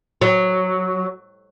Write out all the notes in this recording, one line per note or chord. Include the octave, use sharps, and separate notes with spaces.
F#3